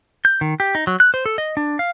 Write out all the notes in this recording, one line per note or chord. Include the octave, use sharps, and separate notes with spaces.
G6
D#3
G4
D#4
F#3
F#6
C5
A4
D#5
D4
F5